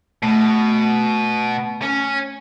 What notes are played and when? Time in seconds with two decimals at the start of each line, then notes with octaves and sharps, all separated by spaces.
0.23 B2 A3
1.82 C#4